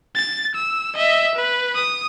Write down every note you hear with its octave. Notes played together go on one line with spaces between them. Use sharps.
A6
E6
D#5 E5
B4
D#6